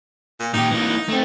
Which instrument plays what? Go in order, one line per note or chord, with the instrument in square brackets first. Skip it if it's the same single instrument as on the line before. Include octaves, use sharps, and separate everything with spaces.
[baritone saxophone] A#2
[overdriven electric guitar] A#2 G4 [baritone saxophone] D#4
[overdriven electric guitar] E3 A#3
A3 C4